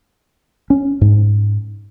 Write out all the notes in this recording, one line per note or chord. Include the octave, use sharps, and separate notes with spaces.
C#4
G#2